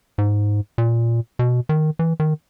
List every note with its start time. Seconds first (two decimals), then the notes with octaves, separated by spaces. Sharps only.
0.18 G#2
0.78 A#2
1.39 B2
1.69 D#3
1.99 E3
2.20 D#3